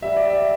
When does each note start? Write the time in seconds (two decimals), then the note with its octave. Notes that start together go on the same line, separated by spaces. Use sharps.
0.02 G3 E5
0.17 D5
0.30 E5